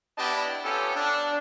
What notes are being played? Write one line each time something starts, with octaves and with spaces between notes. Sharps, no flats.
B3 D4 E4 G4 D#5 A5
B3 C#4 F4 G4 A4
D4